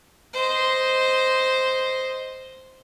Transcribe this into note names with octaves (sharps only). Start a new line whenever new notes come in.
C5 D#5